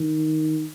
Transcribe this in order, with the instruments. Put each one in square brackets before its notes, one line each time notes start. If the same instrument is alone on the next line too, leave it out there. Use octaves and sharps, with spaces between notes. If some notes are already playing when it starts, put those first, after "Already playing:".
Already playing: [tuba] D#3